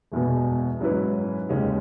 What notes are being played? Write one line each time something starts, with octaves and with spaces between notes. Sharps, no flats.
E1 E2 B2
G#2 F#3 C#4 E4 B4
D#2 C#3 G#3 C#4